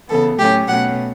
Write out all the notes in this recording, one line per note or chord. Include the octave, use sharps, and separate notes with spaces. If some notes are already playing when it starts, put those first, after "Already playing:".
C#3 E3 B3 A4
A2 F#3 A3 C#4 G4
B2 A3 C#4 F#5